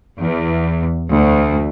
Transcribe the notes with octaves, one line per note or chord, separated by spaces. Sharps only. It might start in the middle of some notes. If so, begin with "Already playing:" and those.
E2
D2